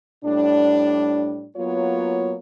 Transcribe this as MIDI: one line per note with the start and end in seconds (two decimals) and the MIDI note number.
0.24 1.48 45
0.24 1.48 55
0.24 1.48 62
1.57 2.36 54
1.57 2.36 58
1.57 2.36 59
1.57 2.36 65
1.57 2.36 73